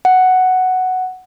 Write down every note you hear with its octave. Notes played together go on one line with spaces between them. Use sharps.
F#5